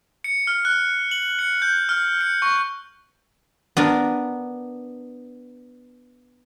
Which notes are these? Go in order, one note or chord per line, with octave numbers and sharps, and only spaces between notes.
C#7
F6
F#6
F#7
C#7
G6
F6
C#7
C#6
B3 D4 A#4